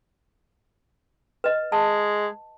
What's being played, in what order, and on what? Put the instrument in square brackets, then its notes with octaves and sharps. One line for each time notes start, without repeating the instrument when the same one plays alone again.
[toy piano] B4 D#5
[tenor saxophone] G#3 [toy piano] A5